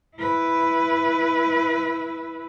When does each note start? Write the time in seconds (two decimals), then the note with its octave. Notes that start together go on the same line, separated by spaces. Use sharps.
0.16 E4 B4